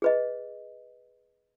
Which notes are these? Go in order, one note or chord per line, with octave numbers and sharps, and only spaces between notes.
G#4 B4 D#5